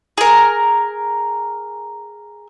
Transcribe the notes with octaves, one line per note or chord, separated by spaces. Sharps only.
G#4 A#4